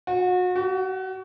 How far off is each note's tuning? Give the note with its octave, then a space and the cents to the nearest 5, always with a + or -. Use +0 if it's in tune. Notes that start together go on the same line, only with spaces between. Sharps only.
F#4 -35
F#4 +30